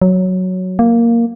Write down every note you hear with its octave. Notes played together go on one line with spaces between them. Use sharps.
F#3
A#3